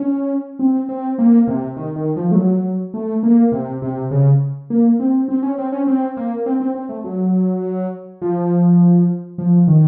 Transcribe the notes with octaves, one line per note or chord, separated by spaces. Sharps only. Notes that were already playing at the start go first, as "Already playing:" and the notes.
Already playing: C#4
C4
C4
A#3
C3
D#3
D#3
F3
A3
F#3
A3
A#3
C3
C3
C#3
A#3
C4
C4
C#4
C4
C#4
C4
A#3
C4
C4
C4
A3
F#3
F3
F3
D#3